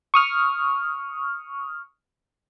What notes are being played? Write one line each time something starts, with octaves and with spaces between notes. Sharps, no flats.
C#6 D#6 F6